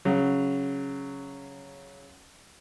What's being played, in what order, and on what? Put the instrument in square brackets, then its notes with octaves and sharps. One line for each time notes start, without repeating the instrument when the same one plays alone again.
[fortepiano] C#3 F#3